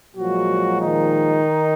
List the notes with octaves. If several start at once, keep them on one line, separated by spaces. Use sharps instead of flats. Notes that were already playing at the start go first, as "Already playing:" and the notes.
A#2 F3 F#3 G#3 F#4
D#3 D#4